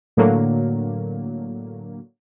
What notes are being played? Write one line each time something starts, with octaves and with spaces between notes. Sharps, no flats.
A2 D3 F#3 A#3